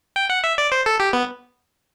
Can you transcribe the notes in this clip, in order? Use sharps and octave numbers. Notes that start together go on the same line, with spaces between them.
G5
F#5
E5
D5
C5
A4
G4
B3